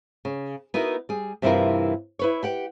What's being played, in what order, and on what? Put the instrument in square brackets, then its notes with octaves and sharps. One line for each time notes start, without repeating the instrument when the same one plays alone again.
[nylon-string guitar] C#3
B3 D#4 E4 F#4 A#4
G3 G#4
G2 C3 E3 E4 F4 A#4
E4 B4 C#5
G4 F#5 G5